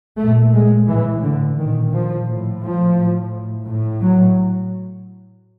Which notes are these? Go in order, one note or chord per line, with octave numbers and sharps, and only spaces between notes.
A#2 A3
G#3
A2 E3
D3
A#2 D#3
F3
A2
F3
A2
A2
F#3